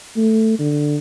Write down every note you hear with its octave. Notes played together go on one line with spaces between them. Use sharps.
A3
D3